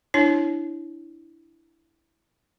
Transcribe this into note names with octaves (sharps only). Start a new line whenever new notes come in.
D4 E4 C#5